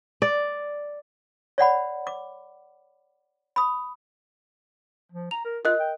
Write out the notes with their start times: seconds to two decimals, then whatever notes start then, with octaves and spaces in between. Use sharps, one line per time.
0.22 D5
1.58 C#5 D5 F#5 B5
2.07 D6
3.56 B5 D#6
5.12 F3
5.31 A#5 F7
5.45 A#4
5.65 F4 A#4 D#5 F#6
5.80 G5